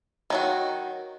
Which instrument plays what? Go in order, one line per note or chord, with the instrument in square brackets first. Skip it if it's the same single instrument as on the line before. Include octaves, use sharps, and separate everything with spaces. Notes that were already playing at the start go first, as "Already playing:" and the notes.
[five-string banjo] D#3 F#3 F#4